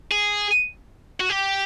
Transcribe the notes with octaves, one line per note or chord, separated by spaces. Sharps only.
G#4
F#4
G4